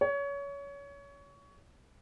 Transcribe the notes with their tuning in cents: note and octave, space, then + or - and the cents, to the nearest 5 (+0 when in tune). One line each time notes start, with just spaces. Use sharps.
C#5 +25